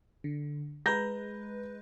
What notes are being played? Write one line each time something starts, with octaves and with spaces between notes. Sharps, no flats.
D3
G#3 B4 A#5 G6 A#6